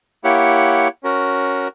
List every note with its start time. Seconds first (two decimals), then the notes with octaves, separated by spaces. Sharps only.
0.24 A#3 E4 G4 C#5 F#5
1.03 C#4 F#4 A#4